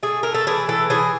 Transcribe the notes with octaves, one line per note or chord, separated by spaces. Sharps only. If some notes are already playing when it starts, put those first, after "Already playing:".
A3 G#4
A3 A#4
A4
E3 G#4
E3 A4
E3 G#4